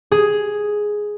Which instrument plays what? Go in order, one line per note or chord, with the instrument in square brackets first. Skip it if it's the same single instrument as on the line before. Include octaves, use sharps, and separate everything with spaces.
[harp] G#4